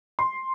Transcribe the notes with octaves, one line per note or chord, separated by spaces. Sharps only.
C6